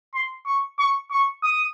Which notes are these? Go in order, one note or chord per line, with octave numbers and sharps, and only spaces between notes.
C6
C#6
C#6
C#6
D#6